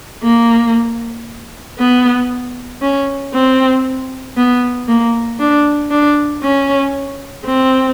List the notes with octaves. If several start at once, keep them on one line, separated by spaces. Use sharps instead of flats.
A#3
B3
C#4
C4
B3
A#3
D4
D4
C#4
C4